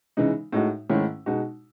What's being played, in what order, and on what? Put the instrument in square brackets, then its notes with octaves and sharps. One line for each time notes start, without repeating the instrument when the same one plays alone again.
[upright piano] C#3 E3 G#3 D#4
A2 G#3 D#4 F#4
G#2 D#3 A3 C#4 E4
B2 G#3 D#4 F#4